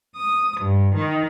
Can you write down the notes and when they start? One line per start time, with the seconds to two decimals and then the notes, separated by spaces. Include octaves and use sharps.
0.16 D#6
0.60 G2
0.95 D#3